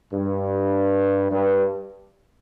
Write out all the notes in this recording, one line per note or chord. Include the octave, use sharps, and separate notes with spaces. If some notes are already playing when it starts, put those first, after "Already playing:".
G2
G2